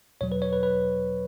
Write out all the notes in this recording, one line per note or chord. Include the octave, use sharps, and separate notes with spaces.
E2 B2 F#3 C#5
B4
C#5
B4
B4